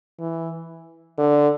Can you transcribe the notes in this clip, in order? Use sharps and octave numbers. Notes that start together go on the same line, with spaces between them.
E3
D3